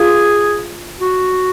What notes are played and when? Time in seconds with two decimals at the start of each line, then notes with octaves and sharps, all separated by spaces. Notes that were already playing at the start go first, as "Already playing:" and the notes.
Already playing: F4 G#4
1.01 F#4